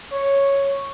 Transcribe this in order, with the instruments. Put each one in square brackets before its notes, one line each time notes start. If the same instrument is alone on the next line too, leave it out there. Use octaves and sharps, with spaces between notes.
[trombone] C#5